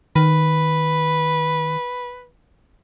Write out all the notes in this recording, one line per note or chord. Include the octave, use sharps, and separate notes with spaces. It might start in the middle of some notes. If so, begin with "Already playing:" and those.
D#3 B4